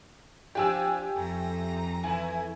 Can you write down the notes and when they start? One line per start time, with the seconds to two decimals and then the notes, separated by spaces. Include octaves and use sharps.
0.55 F3 C4 D4 G4 G#5 E6
1.16 F2 A3 A#5
2.04 E3 A3 E4 G#5